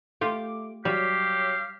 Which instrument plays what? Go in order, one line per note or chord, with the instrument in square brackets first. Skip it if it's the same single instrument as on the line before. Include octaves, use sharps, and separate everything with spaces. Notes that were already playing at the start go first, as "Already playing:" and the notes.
[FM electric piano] A3 D6 [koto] F4 G4
[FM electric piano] F#3 C#5 B6 [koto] G3 [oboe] G4 [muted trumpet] F5